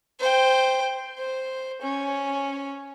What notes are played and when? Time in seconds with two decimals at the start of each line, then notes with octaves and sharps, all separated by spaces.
0.20 C5 G5
1.18 C5
1.82 C#4